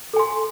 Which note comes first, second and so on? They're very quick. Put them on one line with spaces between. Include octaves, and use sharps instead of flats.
A4 G#5 C6